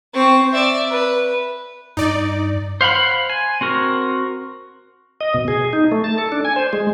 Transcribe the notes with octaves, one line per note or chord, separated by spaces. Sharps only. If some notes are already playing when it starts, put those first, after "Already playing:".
C4 C#6
D5 E5
B4
G2 D#4 D5
C5 F5 F#5 B5
G#5
C4 F#4 A#4
D#5
B2
G#4
D#4
A3
A5
A4
D4
G#5
C5
G#3